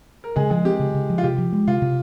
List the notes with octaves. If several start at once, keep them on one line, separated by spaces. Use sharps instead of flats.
A#4
C#3 G#3 G#4
F3 G#3 G#4
C4 G4
C#3
C#3
F3
F4
C3 G4
F3
G#3
C3 F4
C3